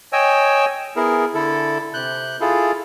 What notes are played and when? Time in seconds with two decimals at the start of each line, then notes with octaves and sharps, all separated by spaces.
0.13 C#5 D#5 G5 G#5 E6
0.96 B3 E4 G#4 A#4
1.34 D3 E4 A4
1.94 C3 F#6 G6
2.41 E4 F4 G#4 A4